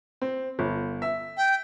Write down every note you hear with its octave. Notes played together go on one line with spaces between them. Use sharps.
C4
G1
E5
G5